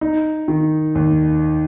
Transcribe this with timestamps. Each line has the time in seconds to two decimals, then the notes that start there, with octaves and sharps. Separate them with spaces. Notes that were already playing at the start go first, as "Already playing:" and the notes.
0.01 D#4
0.48 D#3
0.95 D#2